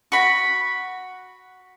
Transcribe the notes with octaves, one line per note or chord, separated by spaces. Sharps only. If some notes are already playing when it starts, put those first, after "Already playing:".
F#4 B5